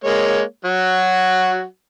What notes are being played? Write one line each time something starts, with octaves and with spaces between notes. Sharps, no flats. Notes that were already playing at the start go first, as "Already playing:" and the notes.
G#3 A#3 C#5
F#3 F#4